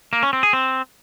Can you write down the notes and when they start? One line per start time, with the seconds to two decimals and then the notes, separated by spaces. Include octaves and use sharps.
0.13 A#3
0.23 C#4
0.33 C4
0.43 G#4
0.53 C4